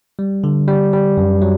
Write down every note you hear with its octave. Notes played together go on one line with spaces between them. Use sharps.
G3
D3
G3
G3
F#2
F#3